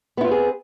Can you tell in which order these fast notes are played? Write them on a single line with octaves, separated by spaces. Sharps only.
B3 E4 F4 C4 G#4